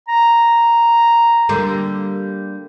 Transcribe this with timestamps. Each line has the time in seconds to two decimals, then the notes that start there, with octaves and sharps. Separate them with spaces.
0.09 A#5
1.49 D3 G3 A#3